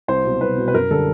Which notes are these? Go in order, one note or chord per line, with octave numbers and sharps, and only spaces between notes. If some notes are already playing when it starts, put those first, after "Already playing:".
C2 C5
B2 F#3
C2 B4
B2 F#3
B4
F#2 A#4
D3 G3 A4